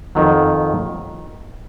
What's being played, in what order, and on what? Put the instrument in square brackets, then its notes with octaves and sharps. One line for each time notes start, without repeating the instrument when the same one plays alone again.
[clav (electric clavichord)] F2 D#3 F#3